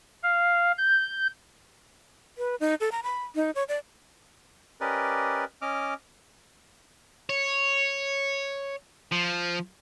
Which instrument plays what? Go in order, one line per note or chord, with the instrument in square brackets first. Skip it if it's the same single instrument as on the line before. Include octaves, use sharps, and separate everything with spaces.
[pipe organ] F5
G6
[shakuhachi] B4
D#4
A4
A#5
B5
D#4
C#5
D5
[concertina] C#4 G4 A#4 B4 D5 D#5
C#4 D#5 D6 F6
[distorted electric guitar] C#5
F3